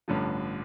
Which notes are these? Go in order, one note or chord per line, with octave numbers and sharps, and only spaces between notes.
A1 G2 D3 F3